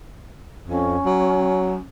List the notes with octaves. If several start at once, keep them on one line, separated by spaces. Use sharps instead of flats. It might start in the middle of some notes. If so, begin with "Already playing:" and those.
F2 C#4
F#3